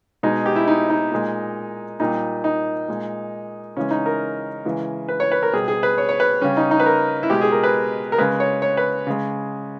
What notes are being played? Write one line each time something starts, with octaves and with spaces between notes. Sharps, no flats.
B2 G#3 D#4
G4
E4
D#4
D#4
A#2 G#3
A#2 G3 D#4
D#4
A#2 G#3
C#3 E3 G#3 C#4
D#4
A#4
C#3 E3 G#3
B4
C#5
B4
A#4
B2 G3 G#4
G#4
B4
C#5
C#5
B4
C#3 G3 C#4
D#4
D#4
B4
A#4
E4
B2 G#3 G4
G#4
A#4
B4
A#4
C#3 G#3 B4
C#5
C#5
B4
C#3 G#3